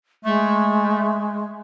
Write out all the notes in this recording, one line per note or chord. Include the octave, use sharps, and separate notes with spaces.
G#3 A3